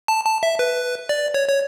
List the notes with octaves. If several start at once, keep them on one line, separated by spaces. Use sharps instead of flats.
A5
A5
E5
B4
D5
C#5
C#5